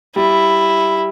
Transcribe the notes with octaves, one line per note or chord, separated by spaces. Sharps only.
G3 E4